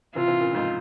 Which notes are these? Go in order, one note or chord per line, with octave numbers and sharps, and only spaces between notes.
C3 E3 F4
C3 E3
A#2 C#3
F2 G#2